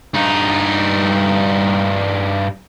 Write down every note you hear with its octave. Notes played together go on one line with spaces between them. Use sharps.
G2 D#4